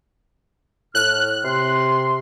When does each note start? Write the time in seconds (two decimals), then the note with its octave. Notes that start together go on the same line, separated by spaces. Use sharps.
0.95 A2 F6 F#6
1.45 C3 C6